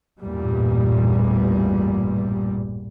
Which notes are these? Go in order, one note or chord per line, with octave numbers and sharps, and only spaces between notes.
A1 E2 G2 A#2 G3